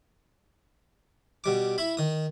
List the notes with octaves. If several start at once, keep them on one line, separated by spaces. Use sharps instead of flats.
B2 G3 D6
E4 B5
D#3 D#6